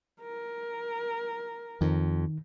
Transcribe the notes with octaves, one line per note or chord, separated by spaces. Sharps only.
A#4
F2 D#3